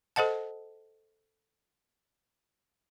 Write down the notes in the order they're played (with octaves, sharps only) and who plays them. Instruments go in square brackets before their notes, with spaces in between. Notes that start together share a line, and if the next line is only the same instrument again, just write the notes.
[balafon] A4 C5 D#5 F#5 A5